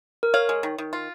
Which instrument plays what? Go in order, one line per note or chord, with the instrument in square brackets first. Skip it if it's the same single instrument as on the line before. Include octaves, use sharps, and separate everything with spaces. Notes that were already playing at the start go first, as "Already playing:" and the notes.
[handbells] A#4
[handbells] C#5 [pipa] F5
[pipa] G#3
D#3
D#3
F4